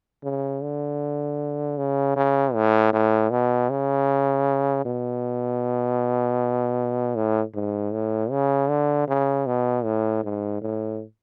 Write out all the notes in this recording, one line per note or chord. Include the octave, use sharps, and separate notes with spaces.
C#3
D3
C#3
C#3
A2
A2
B2
C#3
B2
A2
G#2
A2
C#3
D3
C#3
B2
A2
G#2
A2